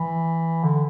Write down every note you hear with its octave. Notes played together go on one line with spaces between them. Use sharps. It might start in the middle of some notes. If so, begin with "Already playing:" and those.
Already playing: E3
D3